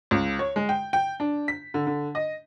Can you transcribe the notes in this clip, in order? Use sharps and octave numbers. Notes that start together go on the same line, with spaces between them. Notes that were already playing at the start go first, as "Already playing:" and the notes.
C#2
C#5
G#3
G5
G5
D4
B6
D3
D3
D#5